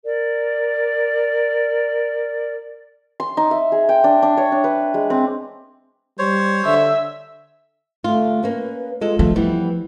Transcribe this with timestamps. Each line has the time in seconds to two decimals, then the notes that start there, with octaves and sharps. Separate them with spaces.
0.03 A#4 D5
3.20 C6
3.37 D#4
3.51 E5
3.72 G#4
3.89 G5
4.04 D4
4.22 D4
4.37 C#5
4.52 D4
4.64 B4
4.94 G#3
5.10 C4
6.19 G3 C5 C#5
6.65 D3 E5
8.04 D3 A3 F4
8.44 A#3 C#4 B4
9.01 G#3 F4 A4
9.19 F3 A3
9.36 E3 G3 B3 E4